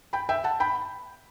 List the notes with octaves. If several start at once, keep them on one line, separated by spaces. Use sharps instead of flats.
G5 B5
E5 G5
F#5 A5
G5 B5